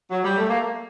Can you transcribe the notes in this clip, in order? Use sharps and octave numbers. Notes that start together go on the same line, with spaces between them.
F#3
G3
A3
A#3